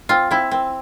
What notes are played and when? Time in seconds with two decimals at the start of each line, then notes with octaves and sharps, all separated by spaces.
0.09 C4 F4
0.31 C4 E4
0.51 C4